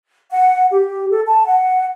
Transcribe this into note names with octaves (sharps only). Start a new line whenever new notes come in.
F#5
G4
A4
A5
F#5